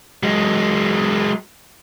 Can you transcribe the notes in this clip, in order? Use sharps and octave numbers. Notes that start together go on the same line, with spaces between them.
F#3 G#3